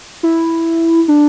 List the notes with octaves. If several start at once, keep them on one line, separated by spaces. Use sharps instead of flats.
E4
D4